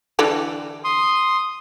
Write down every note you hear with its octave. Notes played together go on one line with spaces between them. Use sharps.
D3 E3 G3
C6 D#6